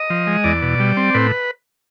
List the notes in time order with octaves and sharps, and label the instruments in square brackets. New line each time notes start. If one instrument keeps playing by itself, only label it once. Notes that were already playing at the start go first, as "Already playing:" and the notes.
Already playing: [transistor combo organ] D#5
F3
G#3
E2 D5
B2
G3
C4
A2 B4